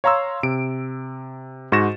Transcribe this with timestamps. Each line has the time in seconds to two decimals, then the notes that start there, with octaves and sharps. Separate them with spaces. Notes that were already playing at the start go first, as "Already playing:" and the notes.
0.04 C#5 F5 A#5 C6 E6
0.43 C3 D7
1.72 G#2 F#4 C#6 A6 A#6 E7